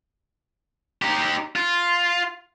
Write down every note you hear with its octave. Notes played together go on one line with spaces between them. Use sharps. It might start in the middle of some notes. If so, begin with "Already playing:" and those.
D#4 G4
F4